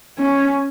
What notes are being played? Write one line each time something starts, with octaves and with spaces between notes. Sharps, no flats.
C#4